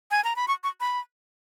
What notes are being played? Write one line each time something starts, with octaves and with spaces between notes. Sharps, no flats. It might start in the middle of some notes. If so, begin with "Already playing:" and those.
G#5
A#5
B5
C#6
C#6
B5